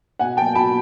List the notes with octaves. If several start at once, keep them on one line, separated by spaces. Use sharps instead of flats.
B2 F#5 G#5
F#3 A#3 G5 A5
B2 A5 B5